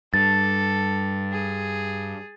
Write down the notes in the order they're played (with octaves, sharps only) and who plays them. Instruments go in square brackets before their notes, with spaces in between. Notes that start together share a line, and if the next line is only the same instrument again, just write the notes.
[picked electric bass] G2 [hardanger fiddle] A4 [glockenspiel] A6
[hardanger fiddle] G#4